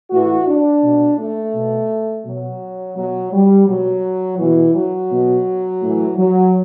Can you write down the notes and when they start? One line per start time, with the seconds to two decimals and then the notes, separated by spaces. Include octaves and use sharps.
0.10 A2 E3 F#4
0.47 D4
0.82 B2
1.18 A3
1.53 B2
2.25 B2 F#3
2.96 B2 F#3
3.32 G3
3.67 B2 F#3
4.38 B2 E3
4.75 F#3
5.10 B2
5.81 A2 E3
6.17 F#3